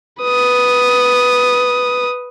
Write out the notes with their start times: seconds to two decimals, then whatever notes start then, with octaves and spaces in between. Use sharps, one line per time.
0.22 B4 D#6